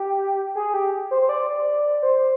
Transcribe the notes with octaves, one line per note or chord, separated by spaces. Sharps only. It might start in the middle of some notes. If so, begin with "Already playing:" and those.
Already playing: G4
G#4
G4
C5
C5
D5
C5